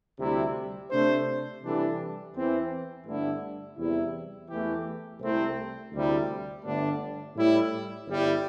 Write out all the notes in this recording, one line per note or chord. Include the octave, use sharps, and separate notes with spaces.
D2 C3 G3 E4
C3 A3 D4 C5
C3 E3 G3 D4 A4
E2 E3 C4
G1 G2 D3 A3 E4
E2 C3 G3 E4
E2 E3 A3 E4 G4
C2 C3 A3 C4 E4
D2 C3 G3 E4
G1 G2 D3 A3 D4
A2 G3 E4
G1 G2 G3 E4